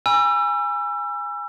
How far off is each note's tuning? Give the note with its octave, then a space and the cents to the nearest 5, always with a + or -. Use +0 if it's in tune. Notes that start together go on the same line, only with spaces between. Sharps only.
G#5 -15 B5 -35 E6 +30